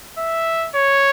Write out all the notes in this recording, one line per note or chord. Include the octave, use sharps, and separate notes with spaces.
E5
C#5